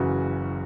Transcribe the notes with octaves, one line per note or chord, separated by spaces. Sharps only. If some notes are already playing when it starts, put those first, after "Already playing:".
Already playing: F#1 F#2 C#3 E3 F#4